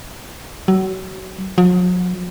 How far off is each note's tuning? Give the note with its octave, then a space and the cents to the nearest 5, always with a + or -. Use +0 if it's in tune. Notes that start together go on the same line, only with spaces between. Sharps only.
F#3 +30
F#3 -45